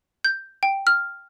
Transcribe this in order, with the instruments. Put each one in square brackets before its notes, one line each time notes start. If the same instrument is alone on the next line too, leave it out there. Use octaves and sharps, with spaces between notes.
[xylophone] G6
G5
F6